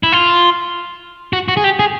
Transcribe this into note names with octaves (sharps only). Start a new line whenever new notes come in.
E4
F4
F#4
F#4
G#4
G4
G#4